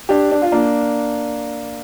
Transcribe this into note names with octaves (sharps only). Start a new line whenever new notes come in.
D4 G4
D4
F4
A#3 D4